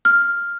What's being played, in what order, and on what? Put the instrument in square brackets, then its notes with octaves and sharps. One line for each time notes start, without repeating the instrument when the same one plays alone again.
[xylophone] F6